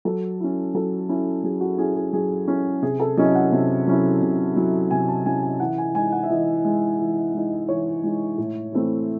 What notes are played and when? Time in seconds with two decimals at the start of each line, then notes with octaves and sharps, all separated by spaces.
0.05 F#3 A4
0.40 C#4 E4
0.74 F#3 A4
1.09 C#4 E4
1.44 F#3 G#4
1.61 F#4
1.78 C#4 E4 G#4
1.96 G#4
2.13 F#3 G#4
2.48 C#4 E4
2.82 C3 G#4
3.00 A4
3.17 F#3 C#4 E4 D#5
3.35 F#5
3.52 C3
3.87 F#3 C#4 E4
4.22 C3
4.56 F#3 C#4 E4
4.91 C3 G#5
5.08 A5
5.26 F#3 C#4 E4 G#5
5.43 G#5
5.60 E3 F#5
5.78 G#5
5.95 G#3 D#4 G#5
6.12 F#5
6.23 E5
6.29 E3 D#5
6.65 G#3 D#4
6.99 E3
7.34 G#3 D#4
7.68 E3 C#5
8.03 G#3 D#4
8.38 A2
8.73 E3 A3 C4 E4